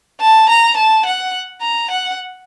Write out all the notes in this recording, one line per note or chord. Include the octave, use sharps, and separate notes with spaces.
A5
A#5
A5
F#5
A#5
F#5